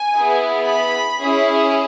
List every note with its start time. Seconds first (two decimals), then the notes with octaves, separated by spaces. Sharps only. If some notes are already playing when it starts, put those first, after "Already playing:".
Already playing: G#5
0.14 B3 E4 G#4
0.66 B5
1.19 C#4 E4 G#4